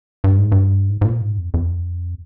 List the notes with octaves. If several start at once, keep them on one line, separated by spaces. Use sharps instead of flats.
G2
G#2
G2
G#2
G#2
A#2
G#2
F2
F2